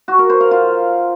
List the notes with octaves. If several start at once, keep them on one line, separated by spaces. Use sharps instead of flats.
F#4
A#4
C5
F5
F4